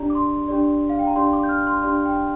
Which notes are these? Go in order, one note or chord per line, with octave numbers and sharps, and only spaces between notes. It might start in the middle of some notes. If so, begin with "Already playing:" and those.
Already playing: D4 G4 D5 A#5
D6
C6
D4 G4 D5
F5
G5
A#5
D4 G4 D5 C6
D6
G6
F6
C6
D4 G4 D5 C6
G5